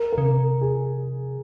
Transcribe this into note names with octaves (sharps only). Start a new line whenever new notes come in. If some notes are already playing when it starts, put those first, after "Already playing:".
Already playing: A#4
A#4
C#3
C3
G#4